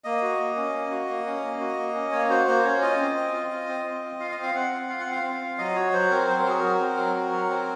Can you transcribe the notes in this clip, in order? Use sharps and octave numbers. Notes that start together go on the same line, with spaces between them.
A#3 D#5
F#4
A#3
C#4
A#3
F#4
A#3
C#4
A#3
F#4
A#3
C#4
A#3 C#5
F#4 C5
A#3 C5
C#4 C#5
F4 D#5
C4
C4
F4
F4
C4
C4
F4
F4 F5
D#5
C4
F5
C4 F#5
F4
F4 F5
F#5
C4
F5
C4
F4
F#3 D#5
F#4 C#5
F#3 C5
C4 A#4
F#3 C5
A#4
F#4 G#4
F#3 A#4
C4
F#3
F#4
F#3
C4